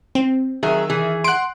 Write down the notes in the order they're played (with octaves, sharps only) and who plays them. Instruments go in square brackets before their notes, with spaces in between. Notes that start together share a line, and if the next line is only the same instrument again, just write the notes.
[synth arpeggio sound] C4
[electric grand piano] D#3 E5 [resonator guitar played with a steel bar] F#3 G#4
[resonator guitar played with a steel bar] E3 G#4
[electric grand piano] F#5 C6 [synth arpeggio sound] F#6 D7